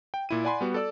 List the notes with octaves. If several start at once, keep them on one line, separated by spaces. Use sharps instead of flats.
G5
A#2 E4 D#7
D5 F#5 G#5 B5 C6
G3 B3 F#4
A4 D5 E6